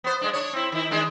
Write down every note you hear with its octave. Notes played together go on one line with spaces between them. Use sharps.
B3 C5
G2 G#3 D4
D4 C#5
C4 E4
D#3 E4
D#3 G#3 D4